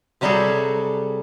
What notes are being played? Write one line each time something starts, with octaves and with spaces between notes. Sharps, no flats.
C3 F#3 G3 F#4 G#4 A4